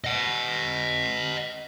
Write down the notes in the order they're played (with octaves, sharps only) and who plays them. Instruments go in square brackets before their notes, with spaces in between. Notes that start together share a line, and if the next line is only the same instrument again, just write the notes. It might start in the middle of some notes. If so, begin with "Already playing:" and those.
[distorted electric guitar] D#5 F#5